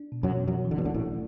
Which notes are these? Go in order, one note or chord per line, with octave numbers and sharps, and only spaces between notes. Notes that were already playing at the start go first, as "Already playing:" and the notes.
Already playing: D4
B2
F#2 F#3
B2
F#2 E3 F#3
E3
D3
B2
D2 D3 E4
A1 A2
A3